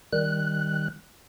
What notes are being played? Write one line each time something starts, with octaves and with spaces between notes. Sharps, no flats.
D#3 G3 F#6